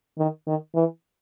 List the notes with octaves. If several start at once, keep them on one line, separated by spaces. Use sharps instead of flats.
D#3
D#3
E3